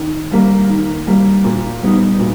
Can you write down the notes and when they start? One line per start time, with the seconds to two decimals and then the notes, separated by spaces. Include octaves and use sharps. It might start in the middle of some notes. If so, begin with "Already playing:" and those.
Already playing: D#3
0.31 G3 A#3
0.69 D#3
1.07 G3 A#3
1.44 A#2
1.82 G3 B3 D#4
2.20 A#2